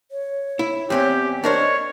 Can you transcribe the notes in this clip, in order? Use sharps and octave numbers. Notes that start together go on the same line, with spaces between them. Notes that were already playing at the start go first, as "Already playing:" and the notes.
C#5
E4
E2 C4 C#4 G4
D4 A#4 C5 C#5 D#5